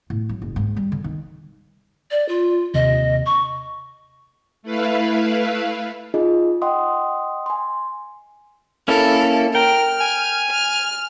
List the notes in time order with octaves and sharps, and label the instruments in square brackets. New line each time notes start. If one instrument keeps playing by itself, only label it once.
[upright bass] A2
F#3
F#1
G#2
G3
D3
D#3
[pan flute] D5
F4
[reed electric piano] D#2 C3 [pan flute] D#5
[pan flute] C#6
[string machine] A3 E4 B4 F5
[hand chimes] D#4 F4 G#4 D#5
D#5 F#5 G5 C6 D#6
G#5 C6
[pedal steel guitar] A#3 C#4 E4 [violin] A4
[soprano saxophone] A#4 [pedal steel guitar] G5 [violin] F6
[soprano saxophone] G#5
[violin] F6